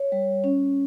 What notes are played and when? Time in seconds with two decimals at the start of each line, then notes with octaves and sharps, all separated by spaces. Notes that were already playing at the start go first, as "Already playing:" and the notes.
Already playing: C#5
0.12 G3
0.44 C#4